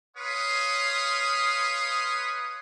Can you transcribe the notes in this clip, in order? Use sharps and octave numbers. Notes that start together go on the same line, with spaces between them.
B4 C#5 F5 C6 D#6